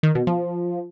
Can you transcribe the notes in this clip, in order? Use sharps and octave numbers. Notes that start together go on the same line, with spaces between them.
D#3
B2
F3